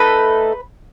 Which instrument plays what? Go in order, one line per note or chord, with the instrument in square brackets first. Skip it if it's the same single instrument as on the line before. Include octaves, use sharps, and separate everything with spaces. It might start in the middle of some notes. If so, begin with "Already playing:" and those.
Already playing: [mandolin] A3 D#4 A4 B4 B5